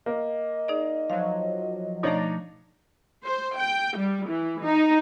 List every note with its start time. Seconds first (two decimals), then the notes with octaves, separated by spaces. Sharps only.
0.06 A#3 D#5
0.68 D#4 G#4 D5
1.10 F3 F#3 F5
2.03 B2 F3 A3 D4 D#4 C#5 D5 A#5
3.24 C5
3.57 G5
3.97 G3
4.29 E3
4.63 D#4